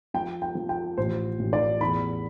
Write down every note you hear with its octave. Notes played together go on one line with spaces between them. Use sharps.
F3 G5
G5
F3
G5
A1 C5
A1
D5
E2 B5